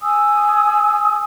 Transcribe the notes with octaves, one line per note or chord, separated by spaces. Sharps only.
G#5 D#6 E6